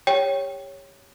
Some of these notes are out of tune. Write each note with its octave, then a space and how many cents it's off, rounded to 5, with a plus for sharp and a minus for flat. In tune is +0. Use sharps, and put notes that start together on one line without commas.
G4 +25 C#5 +0 G5 +0